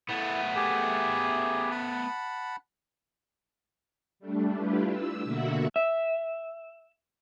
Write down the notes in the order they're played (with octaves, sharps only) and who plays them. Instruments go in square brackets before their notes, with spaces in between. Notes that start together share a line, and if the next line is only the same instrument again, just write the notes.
[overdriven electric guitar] A3 B3 [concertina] E4
[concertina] G4 G#4
F#5 A5 B5
[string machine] G3 A3 D4
D4 E4 F4 G4 B4
E6
B2 D3 A#3 F#4 E5 F#5
[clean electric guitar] E5